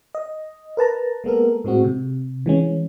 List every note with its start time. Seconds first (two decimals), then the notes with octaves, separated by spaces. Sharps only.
0.15 D#5
0.77 A#4 B4 A5 A#5
1.24 G#3 A#3 B3 A4 A#4
1.64 A2 G#3 C4 F#4
1.84 C3
2.46 E3 G#3 C#4